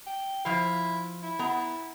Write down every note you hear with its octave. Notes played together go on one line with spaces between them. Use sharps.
G5
F3 E4 F5
E4
B3 A#5